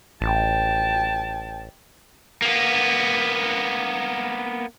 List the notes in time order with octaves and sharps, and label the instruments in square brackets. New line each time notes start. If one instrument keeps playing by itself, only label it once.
[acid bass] A1 [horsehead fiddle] G5 A5
[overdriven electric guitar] A#3 B3